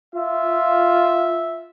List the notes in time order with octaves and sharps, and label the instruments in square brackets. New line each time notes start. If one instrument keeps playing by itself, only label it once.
[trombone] F4 [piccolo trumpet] E5